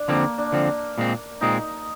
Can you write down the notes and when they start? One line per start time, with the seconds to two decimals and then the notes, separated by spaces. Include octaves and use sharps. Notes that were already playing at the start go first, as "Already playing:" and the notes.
Already playing: D4
0.08 D3 F3 A#3 C4
0.38 D4
0.52 D3 F3 C4
0.98 A#2 G#3 C4
1.41 A#2 G#3 C4 D#4